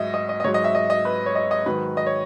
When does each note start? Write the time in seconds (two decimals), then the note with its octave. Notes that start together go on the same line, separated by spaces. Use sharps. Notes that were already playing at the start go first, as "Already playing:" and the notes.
Already playing: G#2 F#3 D#5 E5
0.14 D#5
0.29 D#5
0.40 D#5
0.44 G#2 F#3 C#5
0.54 D#5
0.64 E5
0.75 D#5
0.90 D#5
1.05 B4
1.26 C#5
1.36 D#5
1.51 D#5
1.66 G#2 D#3 F#3 B4
1.97 D#5
2.06 C#5